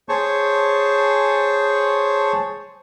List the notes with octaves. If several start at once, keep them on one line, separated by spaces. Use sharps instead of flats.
G#4 C5 C#5 A5 C#6